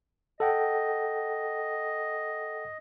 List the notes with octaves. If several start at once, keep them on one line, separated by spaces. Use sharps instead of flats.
A4 D#5 F#5 G5